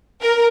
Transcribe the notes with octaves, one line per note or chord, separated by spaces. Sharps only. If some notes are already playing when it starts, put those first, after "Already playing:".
A#4